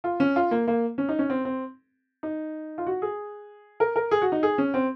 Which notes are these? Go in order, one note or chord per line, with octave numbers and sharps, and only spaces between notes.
F4
C#4
F4
A#3
A#3
C#4
D#4
C#4
C4
C4
D#4
F4
F#4
G#4
A#4
A#4
G#4
F#4
D#4
G#4
C#4
C4